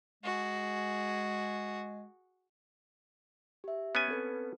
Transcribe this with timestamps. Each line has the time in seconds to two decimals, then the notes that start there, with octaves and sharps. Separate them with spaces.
0.23 G#3 F#4 G#4
3.64 G4 E5
3.95 B3 C#4 G#5
4.08 C4 A4 B4